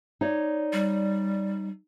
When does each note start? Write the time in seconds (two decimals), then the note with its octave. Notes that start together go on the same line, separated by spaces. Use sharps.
0.21 D#4 C#5 D5
0.73 G3